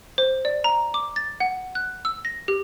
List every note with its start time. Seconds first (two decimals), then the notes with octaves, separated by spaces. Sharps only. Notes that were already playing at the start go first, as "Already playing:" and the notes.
0.18 C5
0.45 D5
0.64 A#5
0.94 D6
1.16 A6
1.40 F#5
1.75 F#6
2.05 E6
2.25 A#6
2.48 G4